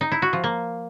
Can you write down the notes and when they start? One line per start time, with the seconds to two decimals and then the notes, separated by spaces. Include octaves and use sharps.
0.01 D#4
0.12 E4
0.22 F#4
0.33 F3
0.44 A#3